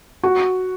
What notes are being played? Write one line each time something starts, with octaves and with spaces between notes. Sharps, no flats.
F#4